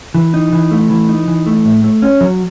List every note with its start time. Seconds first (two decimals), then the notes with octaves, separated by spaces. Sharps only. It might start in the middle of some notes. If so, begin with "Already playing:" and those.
0.15 E3
0.34 D#4
0.53 E3
0.71 A3
0.90 E3
1.09 D#4
1.28 E3
1.46 A3
1.65 A2
1.84 A3
2.02 C#4
2.21 F#3